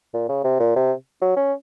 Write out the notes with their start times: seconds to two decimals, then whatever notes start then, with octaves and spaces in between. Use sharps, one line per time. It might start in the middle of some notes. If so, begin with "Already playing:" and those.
0.14 A#2
0.29 C#3
0.44 C3
0.60 A#2
0.76 C3
1.22 F#3
1.37 C#4